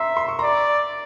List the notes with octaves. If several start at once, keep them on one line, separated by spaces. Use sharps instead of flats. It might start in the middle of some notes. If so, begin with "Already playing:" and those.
Already playing: E5 A#5 C6
C6
C#6
D5 A#5 C6